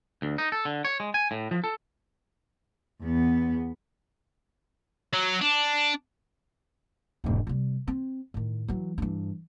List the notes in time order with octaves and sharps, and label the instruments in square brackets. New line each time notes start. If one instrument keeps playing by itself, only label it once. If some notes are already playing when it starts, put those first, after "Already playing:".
[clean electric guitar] D2
D#4
A4
D3
C#5
G#3
G#5
A2
F3
A4
[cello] E2 B3
[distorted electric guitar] F#3
D4
[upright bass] E1 G#2
C3 G3
C4
A2 D#3
E3 F#3
G2 E3